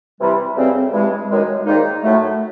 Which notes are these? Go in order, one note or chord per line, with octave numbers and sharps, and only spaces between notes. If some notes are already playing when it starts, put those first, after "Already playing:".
C3 E3 G3
D2 C#3 E3 G3 C4
G2 E3 G#3
F#2 D#3 G#3
G#2 D#3 G3 A#3 D#4
A2 F#3 A3